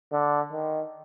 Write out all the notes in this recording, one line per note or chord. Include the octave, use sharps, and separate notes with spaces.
D3
D#3